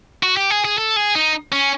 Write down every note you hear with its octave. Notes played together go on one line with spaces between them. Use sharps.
F#4
G4
G#4
G#4
A4
G#4
D#4
C#4